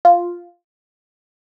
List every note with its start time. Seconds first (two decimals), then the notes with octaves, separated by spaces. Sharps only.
0.05 F4